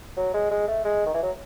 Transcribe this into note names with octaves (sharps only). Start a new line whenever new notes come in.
F#3
G#3
G#3
A3
G#3
D#3
E3
F#3